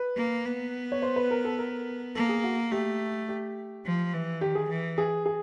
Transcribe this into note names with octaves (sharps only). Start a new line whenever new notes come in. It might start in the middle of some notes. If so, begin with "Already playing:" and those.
Already playing: B4
A#3
B3
C#5
C5
B4
A#4
A4
A#4
A#3 A4
G#4
F#4
A3 G4
G4
F3
E3
D#3 G4
G#4
E3
G#4
G#4